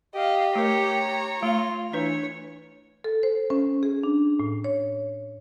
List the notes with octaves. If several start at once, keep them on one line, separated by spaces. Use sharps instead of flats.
G4 D#5 F5
A3 A#4 C#5 A#5
A3 F4
E3 D4 B4 C#5
A4
C5
C#4
G#4
D4
A2
C#5